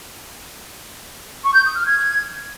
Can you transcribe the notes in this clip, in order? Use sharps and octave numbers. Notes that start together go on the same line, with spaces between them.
C#6
G6
D#6
F6
G#6